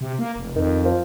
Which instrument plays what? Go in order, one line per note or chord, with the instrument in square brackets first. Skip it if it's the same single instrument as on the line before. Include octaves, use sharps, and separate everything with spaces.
[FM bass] C3
A#3
F1
[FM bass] F2 [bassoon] D#3
[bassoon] F3